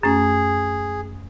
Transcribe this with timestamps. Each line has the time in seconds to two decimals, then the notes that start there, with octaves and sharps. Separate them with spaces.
0.03 F#2 A3 C#4 G#4